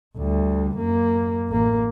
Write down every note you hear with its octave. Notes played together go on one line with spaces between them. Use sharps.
D2 G3
F#2 A#3
A1 A#3